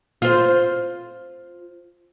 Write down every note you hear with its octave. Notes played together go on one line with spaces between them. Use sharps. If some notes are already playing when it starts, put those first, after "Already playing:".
F4 C5